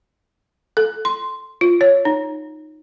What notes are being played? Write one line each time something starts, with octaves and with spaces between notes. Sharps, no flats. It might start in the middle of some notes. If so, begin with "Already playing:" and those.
A4
C6
F4
C#5
D#4